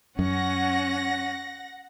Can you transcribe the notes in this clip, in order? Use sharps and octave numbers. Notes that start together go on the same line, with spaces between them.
F#2 C#4 F#5 A#6